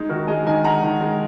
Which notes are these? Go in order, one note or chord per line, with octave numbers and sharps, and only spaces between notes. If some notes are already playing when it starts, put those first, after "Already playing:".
Already playing: G#3 D#4 G#4
D#3 F#4 A#4
G#3 D#5 G#5
D#3 D#5 G#5
G#3 F#5 A#5
D#3
G#3